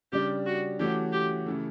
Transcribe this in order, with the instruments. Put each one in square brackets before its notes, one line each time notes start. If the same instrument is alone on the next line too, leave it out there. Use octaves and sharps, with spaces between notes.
[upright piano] C#3 G3 D4 [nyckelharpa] G4
[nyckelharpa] F#4
[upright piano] E3 A3 C#4 F#4 [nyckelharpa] G4
[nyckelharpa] G4
[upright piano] C#3 E3 A3